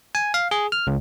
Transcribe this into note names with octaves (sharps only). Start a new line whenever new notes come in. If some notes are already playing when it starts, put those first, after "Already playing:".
G#5
F5
G#4
F6
C#2